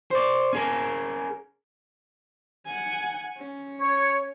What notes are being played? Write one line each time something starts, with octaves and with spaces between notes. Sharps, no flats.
C5 D5
C#4 G#4 A#4
F#5 G#5
C#4
C#5